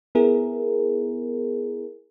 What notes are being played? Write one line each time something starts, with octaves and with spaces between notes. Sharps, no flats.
B3 E4 G#4 A#4